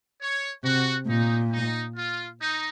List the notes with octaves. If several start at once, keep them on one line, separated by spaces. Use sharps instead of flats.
C#5
C3 F#4
A#2 D#4
D#4
F4
D#4